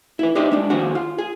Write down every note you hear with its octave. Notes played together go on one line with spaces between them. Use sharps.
E4 B4
D4 D#4 G4 C5 D#5 E5
G#3 D4
D#2 F3 F#4 G#4 F#5
F4
G#4